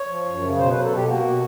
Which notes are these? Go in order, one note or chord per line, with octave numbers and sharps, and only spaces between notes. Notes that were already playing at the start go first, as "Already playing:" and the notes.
Already playing: C#5
F3
F#2
C#3
B2 C5
F#3 B4
A4
B2 G4
A#3 F#4
B2